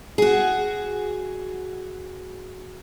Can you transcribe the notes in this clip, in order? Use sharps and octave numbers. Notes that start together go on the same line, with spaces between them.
F#4 G#4